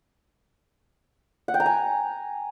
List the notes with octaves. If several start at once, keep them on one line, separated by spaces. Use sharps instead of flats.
F#5
G5
A#5
G#5